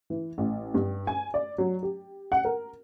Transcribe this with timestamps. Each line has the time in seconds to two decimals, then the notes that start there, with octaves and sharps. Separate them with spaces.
0.10 E3
0.38 A1
0.74 G2
1.07 G#5
1.34 D5
1.58 F#3
1.83 G4
2.32 F#5
2.45 A#4